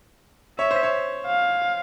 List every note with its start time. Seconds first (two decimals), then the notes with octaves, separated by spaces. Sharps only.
0.59 C#5 E5
0.71 C5
0.83 C#5
1.27 F5